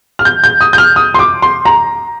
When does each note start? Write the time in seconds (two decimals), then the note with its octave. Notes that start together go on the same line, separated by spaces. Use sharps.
0.19 F6
0.25 G6
0.44 G6
0.61 D#6
0.73 G6
0.78 F6
0.96 D#6
1.14 C6
1.19 D6
1.42 C6
1.65 A#5